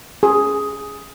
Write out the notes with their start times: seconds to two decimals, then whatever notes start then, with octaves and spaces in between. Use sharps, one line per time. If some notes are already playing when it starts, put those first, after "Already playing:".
0.23 G#4